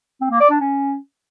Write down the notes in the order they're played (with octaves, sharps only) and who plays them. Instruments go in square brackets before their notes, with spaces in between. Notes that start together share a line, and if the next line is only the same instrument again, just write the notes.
[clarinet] C4
A#3
D5
D4
C#4